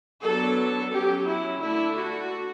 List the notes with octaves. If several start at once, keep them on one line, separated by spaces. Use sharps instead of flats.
F#3 B3 D4 A4
F#3 C#4 G4
E4
D3 A3 D4 E4
F#4